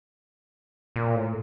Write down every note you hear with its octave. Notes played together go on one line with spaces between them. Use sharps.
A#2
A2